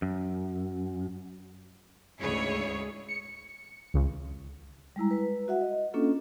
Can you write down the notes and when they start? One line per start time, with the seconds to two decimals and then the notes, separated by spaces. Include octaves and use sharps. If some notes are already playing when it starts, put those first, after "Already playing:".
0.02 F#2
2.21 D2 G#2 C#3 E4 G#4 C#5
3.09 C#7
3.94 C#2
4.96 G3 G#3 E4 A#5
5.11 B4
5.48 F#4 E5 F#5
5.61 D#5
5.94 A#3 C#4 D4 F4 A4